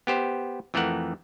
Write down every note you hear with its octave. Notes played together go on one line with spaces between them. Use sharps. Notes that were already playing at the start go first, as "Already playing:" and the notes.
B3 G4 C5
F2 E3 A3 A#4 F#5